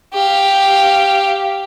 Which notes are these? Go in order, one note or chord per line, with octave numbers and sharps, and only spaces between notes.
G4 F5